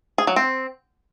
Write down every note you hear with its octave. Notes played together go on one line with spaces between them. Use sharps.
G#4
F#3
C4